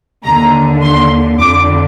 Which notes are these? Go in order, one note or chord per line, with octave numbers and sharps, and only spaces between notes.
D#2 D3 A#5
C6
F2 D3 D6